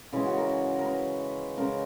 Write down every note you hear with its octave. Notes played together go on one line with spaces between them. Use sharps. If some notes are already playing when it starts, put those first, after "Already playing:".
C#3 E3 G#3 E4
F#4
A#4
A#4
B4
C#3 G#3 A#4